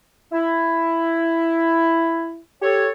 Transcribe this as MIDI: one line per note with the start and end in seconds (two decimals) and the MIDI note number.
0.32 2.39 64
2.61 2.87 67
2.61 2.87 69
2.61 2.87 73